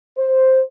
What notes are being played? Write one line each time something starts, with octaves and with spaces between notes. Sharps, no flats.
C5